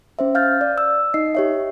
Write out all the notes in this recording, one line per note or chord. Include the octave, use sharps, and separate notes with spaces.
C#4 C5 E5
F5 F6 G6 A6
D5
E6
D#4 D#5 C7
G4 C#5 E5